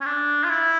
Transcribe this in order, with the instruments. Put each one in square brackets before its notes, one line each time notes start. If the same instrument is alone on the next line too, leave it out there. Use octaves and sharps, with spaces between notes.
[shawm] C#4
D4
F4
E4